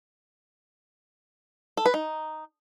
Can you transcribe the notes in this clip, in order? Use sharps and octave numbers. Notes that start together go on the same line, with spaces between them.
A4
B4
D#4